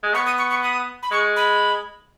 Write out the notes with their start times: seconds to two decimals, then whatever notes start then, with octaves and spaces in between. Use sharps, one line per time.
0.03 G#3
0.14 B3 C#6
0.26 D#6
0.38 C#6
0.50 C#6
0.63 D#6
1.03 B5
1.11 G#3 C#6
1.36 B5